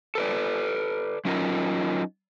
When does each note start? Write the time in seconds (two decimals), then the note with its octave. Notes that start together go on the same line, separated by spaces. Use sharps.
0.15 A4 B4 D5
1.25 F#3 C#4 D#4 F4 A#4